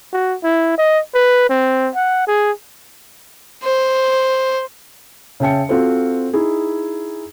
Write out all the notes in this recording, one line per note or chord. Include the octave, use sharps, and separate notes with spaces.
F#4
E4
D#5
B4
C4
F#5
G#4
C5
C#3 C#4 E5 G5 A5 C#7
C4 F4 F#4 A4 C5
D#4 E4 G#4